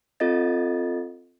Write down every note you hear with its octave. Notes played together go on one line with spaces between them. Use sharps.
C4 F4 A4 D#5 A6